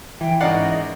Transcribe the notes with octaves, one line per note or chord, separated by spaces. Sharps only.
E3 G5
G#1 C#3 A#4 D5 D#5 F#5 C7